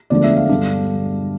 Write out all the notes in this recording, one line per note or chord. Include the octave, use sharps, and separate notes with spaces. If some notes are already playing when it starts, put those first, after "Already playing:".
E1 D2 D3 F3 D5
E5
F5
G2 D3 G3 D4